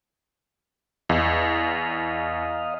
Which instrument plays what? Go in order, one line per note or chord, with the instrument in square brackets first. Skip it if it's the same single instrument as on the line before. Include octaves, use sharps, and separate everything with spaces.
[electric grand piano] E2 [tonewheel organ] D#5 F5